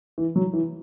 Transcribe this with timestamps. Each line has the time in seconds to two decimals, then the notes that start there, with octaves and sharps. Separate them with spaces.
0.18 E3
0.36 F#3
0.53 E3